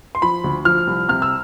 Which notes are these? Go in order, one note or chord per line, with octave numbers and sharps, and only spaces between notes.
C6
F3 B5
D2
F3 F6
C2
C3 F6
E6